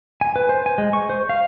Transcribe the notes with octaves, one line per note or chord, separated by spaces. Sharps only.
G#5
B4
C5
G#5
G#3
C#6
C5
F5